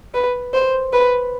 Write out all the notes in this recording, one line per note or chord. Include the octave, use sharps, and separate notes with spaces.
B4
C5
B4